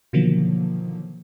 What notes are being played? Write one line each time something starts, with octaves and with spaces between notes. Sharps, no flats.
B2 D3 D#3 F3 F#3 A#3